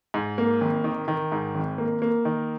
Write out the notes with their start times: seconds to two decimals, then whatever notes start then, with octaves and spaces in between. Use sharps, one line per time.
0.14 G#2
0.38 A#3
0.61 G#1
0.84 D#3
1.08 D#3
1.32 G#2
1.55 G#1
1.78 A#3
2.02 A#3
2.25 D#3